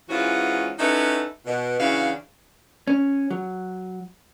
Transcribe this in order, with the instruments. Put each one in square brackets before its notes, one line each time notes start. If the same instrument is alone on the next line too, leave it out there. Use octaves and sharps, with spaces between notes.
[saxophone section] G#2 E3 C#4 F4 F#4
C#4 D#4 E4 F#4 A4 B4
B2
C#3 E3 D4 F#4 F5
[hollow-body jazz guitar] C#4
F#3